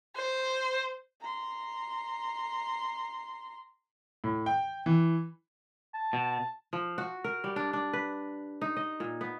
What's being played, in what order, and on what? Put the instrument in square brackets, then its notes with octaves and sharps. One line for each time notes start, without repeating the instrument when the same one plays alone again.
[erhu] C5
[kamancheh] A#5 C6
[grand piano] A2
G5
E3
[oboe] A5
[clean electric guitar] B2
[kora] F3
F#4
A#4
G3
D4
D4
B4
D#4
D#5
A#2
B3